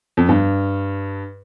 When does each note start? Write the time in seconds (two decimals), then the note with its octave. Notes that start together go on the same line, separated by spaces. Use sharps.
0.17 F2
0.29 G2